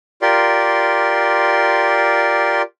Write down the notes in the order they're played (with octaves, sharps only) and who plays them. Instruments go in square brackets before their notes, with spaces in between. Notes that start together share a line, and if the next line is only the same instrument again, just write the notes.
[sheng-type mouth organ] F4 G4 A#4 D5 C6